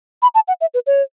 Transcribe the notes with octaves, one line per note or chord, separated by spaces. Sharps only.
B5
A5
F#5
E5
B4
C#5